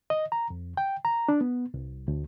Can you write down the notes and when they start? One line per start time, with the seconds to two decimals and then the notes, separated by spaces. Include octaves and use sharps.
0.10 D#5
0.32 A#5
0.50 F2
0.77 G5
1.05 A#5
1.29 D4
1.41 B3
1.74 C2
2.08 D2